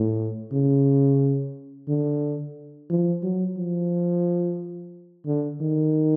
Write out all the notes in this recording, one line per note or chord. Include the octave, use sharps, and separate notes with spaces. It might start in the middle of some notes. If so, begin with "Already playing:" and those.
Already playing: A2
C#3
D3
F3
F#3
F3
D3
D#3